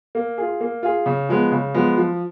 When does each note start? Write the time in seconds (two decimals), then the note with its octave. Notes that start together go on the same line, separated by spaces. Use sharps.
0.15 A#3
0.38 F4 G#4
0.60 A#3
0.83 F4 G#4
1.06 C#3
1.29 F3 G#3 B3
1.51 C#3
1.74 F3 G#3 B3
1.97 F3